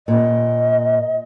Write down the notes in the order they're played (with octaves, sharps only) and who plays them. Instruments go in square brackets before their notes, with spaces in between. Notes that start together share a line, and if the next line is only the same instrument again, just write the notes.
[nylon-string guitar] A#2 [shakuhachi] D#5